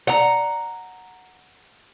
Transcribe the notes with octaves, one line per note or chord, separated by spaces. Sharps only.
F#5 A#5